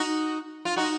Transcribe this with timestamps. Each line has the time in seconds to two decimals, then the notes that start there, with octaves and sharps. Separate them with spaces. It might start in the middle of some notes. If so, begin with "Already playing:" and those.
Already playing: D#4 F#4
0.65 F4
0.76 D#4 F#4